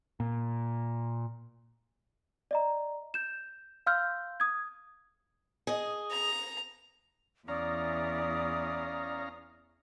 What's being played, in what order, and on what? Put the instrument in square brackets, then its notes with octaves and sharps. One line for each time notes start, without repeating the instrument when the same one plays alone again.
[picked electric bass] A#2
[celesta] D5 D#5 A#5
G6 E7
F5 C6 E6 F6 G6
D#6 G#6
[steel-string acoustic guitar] G#4 D#5
[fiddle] A#5
[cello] E2 E3 [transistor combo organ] C#4 F5 A#5 [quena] D5 [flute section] D#6